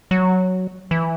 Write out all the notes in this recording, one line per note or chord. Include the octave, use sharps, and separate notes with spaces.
F#3
E3